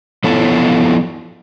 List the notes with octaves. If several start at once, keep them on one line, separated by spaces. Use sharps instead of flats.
F3 B3 E4 F4 A4 C#5